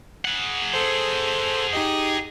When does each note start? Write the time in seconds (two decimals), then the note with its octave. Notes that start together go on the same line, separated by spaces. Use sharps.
0.25 G#4 F#5
0.73 A4 C5
1.73 D#4 G4 D#5